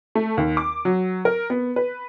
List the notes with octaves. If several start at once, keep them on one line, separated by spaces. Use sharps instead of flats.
A3
D#2
D6
F#3
A#4
B3
B4